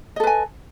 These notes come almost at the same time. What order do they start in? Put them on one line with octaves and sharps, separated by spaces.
D#5 A4 B4 G#5